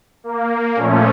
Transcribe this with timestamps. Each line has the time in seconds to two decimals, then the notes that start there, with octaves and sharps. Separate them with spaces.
0.24 A#3
0.76 A#2 F3 A3 C#4